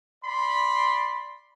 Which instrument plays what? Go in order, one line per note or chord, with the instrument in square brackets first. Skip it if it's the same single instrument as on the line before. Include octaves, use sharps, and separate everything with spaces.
[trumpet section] D5 B5 C6